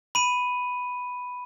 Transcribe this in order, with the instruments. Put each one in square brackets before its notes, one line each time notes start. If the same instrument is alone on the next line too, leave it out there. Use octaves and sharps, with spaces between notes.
[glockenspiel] B5 D#7